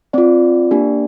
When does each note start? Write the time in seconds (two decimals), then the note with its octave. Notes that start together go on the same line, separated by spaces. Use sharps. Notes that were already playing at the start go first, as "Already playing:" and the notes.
0.13 C4 F4 D5
0.71 A#3 D4 G4